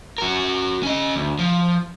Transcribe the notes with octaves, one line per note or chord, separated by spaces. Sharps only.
F#4 A#4
C#4 D#5
D2
F3